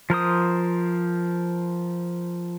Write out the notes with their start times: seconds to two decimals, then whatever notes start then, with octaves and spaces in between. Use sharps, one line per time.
0.10 F3 A#4 C5 D#6